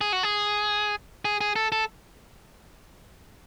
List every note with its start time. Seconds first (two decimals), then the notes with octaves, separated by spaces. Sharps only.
0.01 G#4
0.13 F#4
0.23 G#4
1.25 G#4
1.41 G#4
1.56 A4
1.72 A4